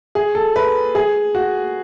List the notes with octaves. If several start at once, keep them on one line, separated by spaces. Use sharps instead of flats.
G#4
A4
B4
G#4
F#4